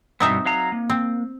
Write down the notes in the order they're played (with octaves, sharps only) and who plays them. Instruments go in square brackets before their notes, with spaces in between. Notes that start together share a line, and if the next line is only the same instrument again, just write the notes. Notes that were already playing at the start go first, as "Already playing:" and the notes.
[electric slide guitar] G2 B2 B3 [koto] C4 D#4 E5
[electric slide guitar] F#3 F5 A#5
A#3
[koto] C4